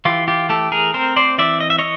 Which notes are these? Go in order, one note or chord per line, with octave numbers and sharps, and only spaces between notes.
E3 F4 G4
F4 G4
A3 G4 A4
G#4 A#4
C4 A#4 C5
C5 D5
E3 D5 E5
D#5
E5
C#5 D#5